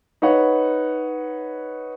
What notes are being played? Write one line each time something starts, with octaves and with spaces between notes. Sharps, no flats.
D#4 B4 C#5 F#5